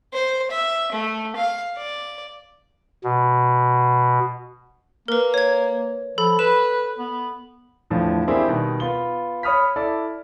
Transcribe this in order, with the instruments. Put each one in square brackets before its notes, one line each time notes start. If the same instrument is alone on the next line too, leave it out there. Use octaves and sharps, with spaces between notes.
[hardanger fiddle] C5
E5
A3
F5
D5
[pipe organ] B2
[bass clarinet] A#3 [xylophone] A#4 B4
[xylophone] C#5 G#6
[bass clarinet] F3 [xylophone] A4 B5
[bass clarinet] B4 [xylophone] E7
[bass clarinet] B3
[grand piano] E2 A2 D3 F3
A#3 C4 D4 E4 G4 G#4
B2 D#3 G3
B3 F4 G7
C#5 B5 D#6 F6 B6
E4 A4 D5